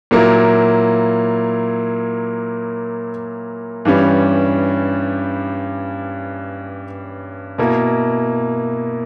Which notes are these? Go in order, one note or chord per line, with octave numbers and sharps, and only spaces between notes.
A#2 F#3 A#3 E4
G2 E3 G3 C#4
B2 A#3 E4